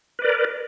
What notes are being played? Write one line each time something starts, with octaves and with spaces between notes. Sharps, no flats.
A#4 B4 D5